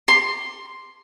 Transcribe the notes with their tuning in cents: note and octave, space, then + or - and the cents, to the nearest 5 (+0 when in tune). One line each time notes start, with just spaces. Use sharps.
C6 +5